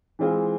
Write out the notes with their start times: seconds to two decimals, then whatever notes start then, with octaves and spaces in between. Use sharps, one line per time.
0.19 E3 G#3 C4 F4 G#4